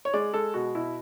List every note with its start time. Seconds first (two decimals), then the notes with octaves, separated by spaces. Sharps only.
0.05 C#5
0.14 G#3 D5
0.34 G#3 A4
0.54 B2 F#4
0.75 B2 E4